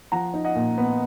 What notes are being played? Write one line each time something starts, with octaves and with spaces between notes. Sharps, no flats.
F3 F#5 A#5
D#4
D#5 F#5
A#2
B3